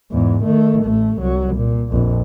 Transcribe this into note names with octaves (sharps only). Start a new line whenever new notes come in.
E2 G#2
D#3 A3
A1 A3
C2 F#3
A#2
A#1 F2